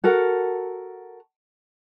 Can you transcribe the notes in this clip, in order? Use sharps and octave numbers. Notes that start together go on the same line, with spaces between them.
F#4 A4 A#4 F#5